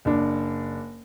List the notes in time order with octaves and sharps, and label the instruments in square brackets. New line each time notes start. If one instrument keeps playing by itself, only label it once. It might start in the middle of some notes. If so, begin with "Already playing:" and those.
[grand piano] F#1 D4